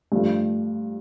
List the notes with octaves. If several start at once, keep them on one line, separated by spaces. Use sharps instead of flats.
G2 F3 A3